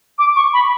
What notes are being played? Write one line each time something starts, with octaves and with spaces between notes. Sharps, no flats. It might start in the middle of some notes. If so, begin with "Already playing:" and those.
D6
C#6
B5